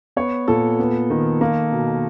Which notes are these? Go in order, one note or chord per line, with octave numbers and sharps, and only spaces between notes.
B3 C#5
A#2 A4
B3
D#3
A#3
B2